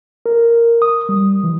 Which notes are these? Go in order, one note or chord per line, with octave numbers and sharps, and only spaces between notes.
A#4
D#6
G3
E3